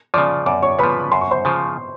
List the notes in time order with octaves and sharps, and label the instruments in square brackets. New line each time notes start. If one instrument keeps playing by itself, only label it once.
[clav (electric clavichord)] C#3 F3 [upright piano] D5 D6
[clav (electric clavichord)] F#2 [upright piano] D5 D6
[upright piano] C#5 C#6
[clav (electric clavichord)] C#3 [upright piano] B4 B5
[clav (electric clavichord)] F3
[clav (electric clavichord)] F#2 [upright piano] C6
[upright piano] C#6
C5 C6
[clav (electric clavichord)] C#3 F3